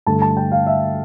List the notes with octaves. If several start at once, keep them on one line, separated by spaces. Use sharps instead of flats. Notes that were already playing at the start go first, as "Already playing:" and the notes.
G2 D3 A3 A5
A5
G5
F5
E5